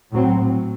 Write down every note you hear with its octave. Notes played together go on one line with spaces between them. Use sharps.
A2 F#3 C4